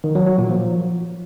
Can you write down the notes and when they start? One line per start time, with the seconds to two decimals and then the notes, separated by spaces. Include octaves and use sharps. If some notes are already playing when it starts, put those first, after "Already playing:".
0.04 D#3
0.15 F#3
0.27 F#3
0.38 A#2
0.49 F3